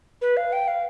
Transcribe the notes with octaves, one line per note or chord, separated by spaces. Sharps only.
B4
F5
G5
F5